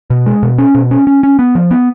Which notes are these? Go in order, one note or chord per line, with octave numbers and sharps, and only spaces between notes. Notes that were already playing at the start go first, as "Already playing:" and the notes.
B2
G#3
B2
C#4
B2
C#4
C#4
C#4
B3
F3
B3